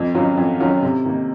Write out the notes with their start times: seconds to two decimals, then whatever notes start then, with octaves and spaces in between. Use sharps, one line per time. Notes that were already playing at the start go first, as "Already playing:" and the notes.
Already playing: F2
0.15 D#3 F#3 C#4 F4
0.37 F2
0.60 D#3 F#3 C#4 F4
0.82 C3
1.06 D#3 A#3